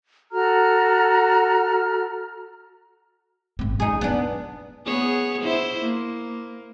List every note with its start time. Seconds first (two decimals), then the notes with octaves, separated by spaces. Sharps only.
0.32 F#4 A4 A#5 F6
3.59 G#1 C4
3.80 D#1 D#4 G#4
4.01 D3 B3 D4
4.86 B3 G#4 C#5
5.42 E4 C5
5.81 A#3